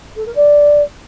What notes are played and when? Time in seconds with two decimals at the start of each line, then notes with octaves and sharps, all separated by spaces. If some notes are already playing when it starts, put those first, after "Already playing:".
0.16 A4
0.26 A#4
0.36 D5